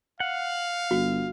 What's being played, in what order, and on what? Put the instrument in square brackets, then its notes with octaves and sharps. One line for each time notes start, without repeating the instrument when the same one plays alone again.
[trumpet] F5 [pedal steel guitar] F#5
[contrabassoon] G1 [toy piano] F#4